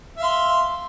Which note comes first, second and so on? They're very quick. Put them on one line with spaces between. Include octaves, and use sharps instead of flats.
E5 F5 C6